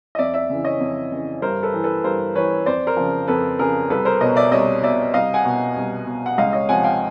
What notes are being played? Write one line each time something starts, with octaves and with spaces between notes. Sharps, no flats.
D#5
F2 D5 E5
D5 E5
C#3 E3
C#5 D#5
F2
C#3 E3
G2 A#4 C5
A4 B4
E3
A4 B4
G2 A#4 C5
E3 B4 C#5
F2 C5 D5
A#4 C5
C#3 F3
F2 A4 B4
C#3 F3 G#4 A#4
C2 A4 B4
A#4 C5
B2 C#5 D#5
D5 E5
C2 C#5 D#5
B2 D5 E5
C2 D#5 F5
F#5 G#5
B2
C2
B2
F#5
C#2 D#5 F5
C#5 D#5
C3 F3 F#5 G#5
F5 G5